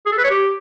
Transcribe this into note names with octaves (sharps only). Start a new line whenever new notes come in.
G#4
A4
B4
C#5
G4